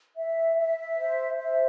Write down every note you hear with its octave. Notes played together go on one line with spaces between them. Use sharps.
E5
E5
C5
E5